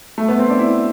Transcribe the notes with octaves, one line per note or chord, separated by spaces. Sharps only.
A3
B3
C4
D4
E4